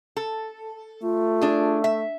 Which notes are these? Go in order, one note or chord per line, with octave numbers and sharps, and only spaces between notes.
A4
A3 F4
D4 G#4
E5